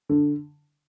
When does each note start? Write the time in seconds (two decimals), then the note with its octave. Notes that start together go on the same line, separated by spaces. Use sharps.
0.09 D3